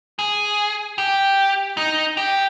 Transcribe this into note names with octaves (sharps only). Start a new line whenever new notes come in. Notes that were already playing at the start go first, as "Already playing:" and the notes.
G#4
G4
D#4
G4